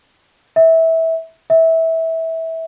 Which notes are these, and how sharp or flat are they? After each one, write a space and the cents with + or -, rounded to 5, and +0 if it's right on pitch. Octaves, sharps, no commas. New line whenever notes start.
E5 -20
E5 -20